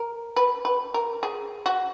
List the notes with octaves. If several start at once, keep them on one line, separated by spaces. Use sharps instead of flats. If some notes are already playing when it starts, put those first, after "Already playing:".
Already playing: A#4
B4
B4
A#4
G#4
F#4